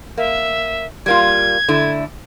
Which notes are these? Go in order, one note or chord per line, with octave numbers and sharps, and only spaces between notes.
A#3 E5
G3 A#3 F4 G#6
D3 A3 E4